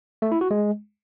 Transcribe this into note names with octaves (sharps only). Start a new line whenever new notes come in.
A3
E4
F#4
G#3